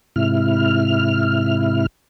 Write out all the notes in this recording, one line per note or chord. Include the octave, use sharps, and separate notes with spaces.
G#2 C3 E4 F6